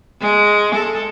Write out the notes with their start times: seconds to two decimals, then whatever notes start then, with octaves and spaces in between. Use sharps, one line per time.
0.21 G#3
0.75 A4